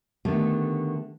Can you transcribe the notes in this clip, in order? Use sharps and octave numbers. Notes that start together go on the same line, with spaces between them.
D3 D#3 A3 B3 G4 A4